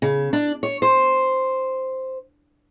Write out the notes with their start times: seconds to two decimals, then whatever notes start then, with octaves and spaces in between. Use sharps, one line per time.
0.02 C#3
0.33 D4
0.63 C#5
0.82 C5